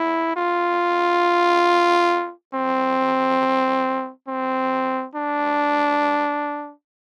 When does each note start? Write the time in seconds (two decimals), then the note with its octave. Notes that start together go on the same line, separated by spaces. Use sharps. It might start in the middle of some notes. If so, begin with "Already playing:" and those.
Already playing: E4
0.36 F4
2.54 C4
4.28 C4
5.16 D4